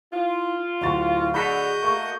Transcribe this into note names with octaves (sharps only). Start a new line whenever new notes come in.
E4 F4
D1 E4 F#4 A6
D3 F#4 G#4 D#5 B5 F#6 G6 B6
A3 A#3 C#6